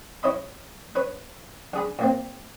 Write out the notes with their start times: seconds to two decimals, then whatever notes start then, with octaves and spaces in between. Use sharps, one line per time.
0.23 E4 C#5 D#5 B5
0.95 B4 C#5 B5
1.73 D3 G#4 B5
1.99 A#2 A#3 C4